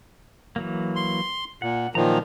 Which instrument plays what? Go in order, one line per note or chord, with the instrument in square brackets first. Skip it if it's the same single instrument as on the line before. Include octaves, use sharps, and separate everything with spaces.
[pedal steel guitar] E3 F#3 A#3
[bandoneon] C6
[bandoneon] A#2 [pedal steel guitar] F#5
[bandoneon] A#2 D#3 F3 [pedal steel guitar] F#3 A#5